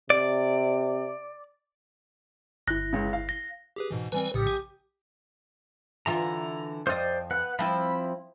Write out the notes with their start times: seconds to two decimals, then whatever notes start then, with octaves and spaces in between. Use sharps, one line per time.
0.10 C3 D5
2.68 G1 E4 F#6 A#6
2.93 C#2 C#3
3.13 F5
3.29 A#6
3.76 G4 G#4 B4
3.91 G#2 B2 E3
4.12 E3 G3 C4 B4 G#5
4.34 A#1 A2 C#3 G4 D#6
4.47 G#5
6.06 D3 E3 F4 A#5
6.87 F2 C5 D5 D#5
7.31 B4 F#5
7.59 F3 C4 E4 B5